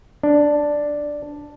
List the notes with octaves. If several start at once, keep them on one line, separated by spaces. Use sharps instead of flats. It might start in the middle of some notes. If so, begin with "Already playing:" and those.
D4